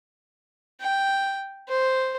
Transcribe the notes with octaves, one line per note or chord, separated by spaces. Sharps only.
G5
C5